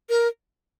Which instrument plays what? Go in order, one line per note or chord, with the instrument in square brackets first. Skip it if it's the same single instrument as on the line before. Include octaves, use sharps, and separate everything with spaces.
[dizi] A#4